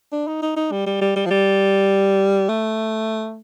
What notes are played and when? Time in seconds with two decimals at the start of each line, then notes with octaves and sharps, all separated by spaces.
0.12 D4
0.28 D#4
0.42 D#4
0.56 D#4
0.72 G3
0.86 G3
1.01 G3
1.16 G3
1.26 F3
1.31 G3
2.49 A3